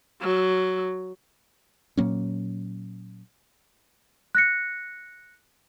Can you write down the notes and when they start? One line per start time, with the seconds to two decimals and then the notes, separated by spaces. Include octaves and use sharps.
0.21 F#3
1.97 A#2 F#3 A#3 C#4
4.35 F#6 A#6 C#7